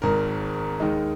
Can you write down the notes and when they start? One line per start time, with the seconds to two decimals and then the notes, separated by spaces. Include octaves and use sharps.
0.02 G#1 G#2 G#3 A#4
0.80 D#2 D#3 G#3 D#4